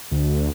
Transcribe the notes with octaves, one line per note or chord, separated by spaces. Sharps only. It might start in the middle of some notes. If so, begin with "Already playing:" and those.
D2